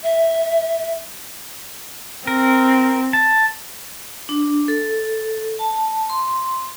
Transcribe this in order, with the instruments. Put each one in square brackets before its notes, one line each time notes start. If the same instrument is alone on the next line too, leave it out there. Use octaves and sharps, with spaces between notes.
[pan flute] E5
[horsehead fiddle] C4 [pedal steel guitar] A#4
[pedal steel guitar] A5
[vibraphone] D4
A4
A5
C6